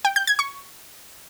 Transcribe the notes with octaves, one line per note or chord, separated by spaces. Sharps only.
G5
G6
G#6
C#6